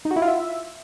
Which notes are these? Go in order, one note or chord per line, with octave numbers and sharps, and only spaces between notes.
D#4
F#4
E4
F4
E5